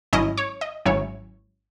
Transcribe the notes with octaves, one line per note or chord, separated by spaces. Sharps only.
G#1 G#2 F#3 C#4 E4 D#5
C#5
D#5
G#1 G#2 F#3 C#4 E4 C#5